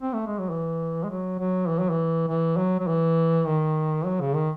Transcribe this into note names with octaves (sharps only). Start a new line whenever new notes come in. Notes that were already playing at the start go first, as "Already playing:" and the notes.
C4
A3
G#3
F#3
E3
G#3
F#3
F#3
E3
F#3
E3
E3
F#3
F#3
E3
D#3
F#3
C#3
D#3